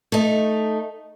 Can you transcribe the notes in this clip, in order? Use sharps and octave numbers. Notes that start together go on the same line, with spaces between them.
A3 D#4